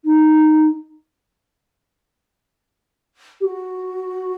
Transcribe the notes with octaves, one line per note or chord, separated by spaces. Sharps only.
D#4
G4
F#4